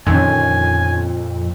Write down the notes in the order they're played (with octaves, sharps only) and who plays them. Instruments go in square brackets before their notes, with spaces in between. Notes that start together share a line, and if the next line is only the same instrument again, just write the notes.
[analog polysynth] F2 [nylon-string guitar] A#2 [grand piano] D3 D#3 C#4 [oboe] G#5